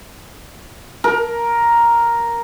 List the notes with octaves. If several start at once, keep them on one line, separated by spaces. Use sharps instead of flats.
A#4